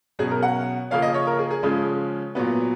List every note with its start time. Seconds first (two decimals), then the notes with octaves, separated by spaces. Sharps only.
0.19 B2 F#3 C#4 G#4
0.31 A#4
0.42 F#5
0.91 C#3 F3 A#3 C#4 F5
1.02 D#5
1.14 C#5
1.27 A#4
1.39 G#4
1.50 G#4
1.63 C#3 F3 G#3 C#4
2.35 A#2 F#3 B3